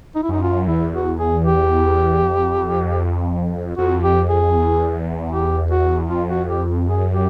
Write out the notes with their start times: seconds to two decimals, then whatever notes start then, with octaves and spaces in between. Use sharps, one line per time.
0.15 D#4
0.23 E4
0.29 F#2 D#4
0.42 F4
0.67 E2 E4
0.93 F#4
1.19 G#4
1.44 G4
2.23 F2
3.77 F2 F#4
4.04 G4
4.29 G#4
4.56 E2
5.32 G4
5.71 F#4
6.10 F2 F4
6.30 F#4
6.49 G4
6.87 F#2 G#4
7.13 G4